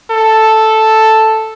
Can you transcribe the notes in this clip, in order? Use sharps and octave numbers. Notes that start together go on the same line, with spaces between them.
A4